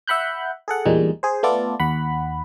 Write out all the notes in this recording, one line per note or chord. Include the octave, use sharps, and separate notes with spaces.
E5 F#5 B5 F#6 G6
G#4 A4 F#5
E2 A#2 G3 G#3 D#4
G#4 C5
A3 B3 F4 A4 D5
D#2 F#5 B5